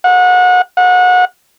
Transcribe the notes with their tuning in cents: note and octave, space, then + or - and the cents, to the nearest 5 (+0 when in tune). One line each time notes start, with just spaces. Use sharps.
F#5 -30
F#5 -30